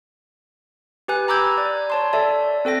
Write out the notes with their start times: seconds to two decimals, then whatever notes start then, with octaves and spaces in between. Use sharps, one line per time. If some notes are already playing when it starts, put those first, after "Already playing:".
1.08 G4 B4 G#5 F#6
1.28 A#5 B5 D6 E6 G6 G#6
1.58 D5
1.90 C#5 A5 C6
2.13 A4 D5 E5 A5
2.65 C4 A4 G5 A#6